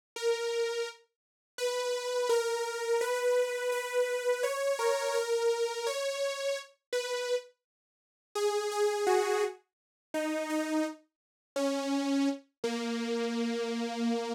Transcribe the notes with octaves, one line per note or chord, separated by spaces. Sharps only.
A#4
B4
A#4
B4
B4
C#5
A#4
A#4
C#5
B4
G#4
G#4
F#4
D#4
D#4
C#4
A#3